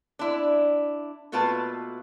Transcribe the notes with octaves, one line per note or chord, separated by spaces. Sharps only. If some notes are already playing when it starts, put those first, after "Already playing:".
D4 E4
B2 A3 A#3 F4 B4 A5